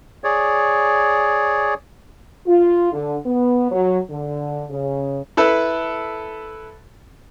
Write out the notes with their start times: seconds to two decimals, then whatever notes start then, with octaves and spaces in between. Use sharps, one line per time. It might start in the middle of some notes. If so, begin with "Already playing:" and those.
0.24 G#4 C#5 D5
2.47 F4
2.92 D3
3.25 B3
3.71 F#3
4.10 D3
4.70 C#3
5.37 E4 A4 B4